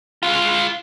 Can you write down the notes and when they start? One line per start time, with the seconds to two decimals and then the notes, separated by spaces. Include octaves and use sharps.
0.23 G#3 F4